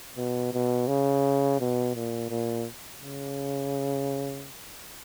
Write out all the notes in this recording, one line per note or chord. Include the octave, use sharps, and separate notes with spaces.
B2
B2
C#3
B2
A#2
A#2
C#3